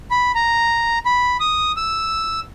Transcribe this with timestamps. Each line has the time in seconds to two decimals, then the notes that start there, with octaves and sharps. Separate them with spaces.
0.11 B5
0.35 A#5
1.05 B5
1.40 D#6
1.77 E6